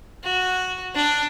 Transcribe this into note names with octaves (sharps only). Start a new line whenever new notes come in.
F#4
D4